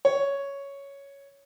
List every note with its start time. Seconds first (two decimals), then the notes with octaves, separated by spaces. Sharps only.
0.05 C#5